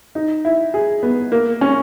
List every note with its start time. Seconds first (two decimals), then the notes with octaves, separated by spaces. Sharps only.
0.15 D#4
0.45 E4
0.74 G#4
1.03 B3
1.32 A#3
1.61 C#4